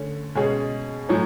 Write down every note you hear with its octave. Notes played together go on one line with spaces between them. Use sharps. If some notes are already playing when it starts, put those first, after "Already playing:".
Already playing: D3 A3 C#4
B2 G#3 C#4 G#4
A2 F#3 C#4